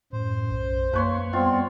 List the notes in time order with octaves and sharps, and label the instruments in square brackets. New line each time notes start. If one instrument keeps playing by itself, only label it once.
[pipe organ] F#2 [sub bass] A2 [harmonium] C5
[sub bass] B1
[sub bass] F#2 [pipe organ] A#3 [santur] B4 C#5 C6
[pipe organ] G3 B3 [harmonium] C4 [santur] F4